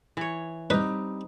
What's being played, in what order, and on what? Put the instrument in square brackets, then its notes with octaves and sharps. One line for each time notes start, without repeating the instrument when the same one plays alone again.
[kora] E3 C#5
[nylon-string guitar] G3 C4 [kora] D#4 [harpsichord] B4